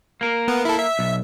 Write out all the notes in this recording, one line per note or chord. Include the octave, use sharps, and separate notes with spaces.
A#3 A#4
B3
E4 A4
E5
B1